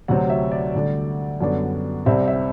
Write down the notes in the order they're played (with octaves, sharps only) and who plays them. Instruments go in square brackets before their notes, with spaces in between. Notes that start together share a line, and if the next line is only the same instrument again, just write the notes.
[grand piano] D2 C3 F#3 C4 F#5
E5
D5
D2 D3 G3 D4
F#2 D3 G3 B3 D4
C2 C3 G3 C4 E5
E5